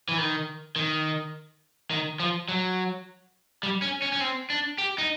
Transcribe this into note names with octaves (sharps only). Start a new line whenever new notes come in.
E3
D#3
D#3
D#3
F3
F#3
G3
C#4
C#4
C#4
C4
D4
G4
D#4